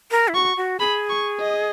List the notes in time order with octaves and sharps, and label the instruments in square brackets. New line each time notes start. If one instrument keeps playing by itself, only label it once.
[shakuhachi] A#4
E4
[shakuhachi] F#4 [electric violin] C#6
[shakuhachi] F#4
[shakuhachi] G#4 [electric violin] B5
[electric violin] C#6
D#5